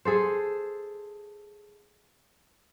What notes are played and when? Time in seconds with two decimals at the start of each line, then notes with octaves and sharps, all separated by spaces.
0.05 G#4 A4 C5